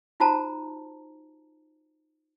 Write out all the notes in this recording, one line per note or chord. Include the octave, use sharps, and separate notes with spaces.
D#4 F4 F#4 C5 A5 A#5